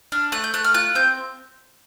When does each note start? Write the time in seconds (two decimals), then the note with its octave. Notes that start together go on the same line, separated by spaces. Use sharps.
0.12 D4 F6
0.32 A3 F#6
0.44 G6
0.54 A3 F#6
0.64 F6
0.74 F4 F#6
0.95 C4 G6